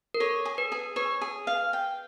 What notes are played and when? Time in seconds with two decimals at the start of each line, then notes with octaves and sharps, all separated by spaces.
0.14 A#4
0.20 A4 C#5
0.45 G#4
0.58 B4
0.72 G#4
0.96 B4 C#5
1.21 G#4
1.47 F5
1.73 G5